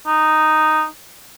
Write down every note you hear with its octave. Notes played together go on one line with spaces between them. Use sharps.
D#4